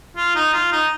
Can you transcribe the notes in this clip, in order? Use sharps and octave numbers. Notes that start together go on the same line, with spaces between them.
F4
D#4
F4
D#4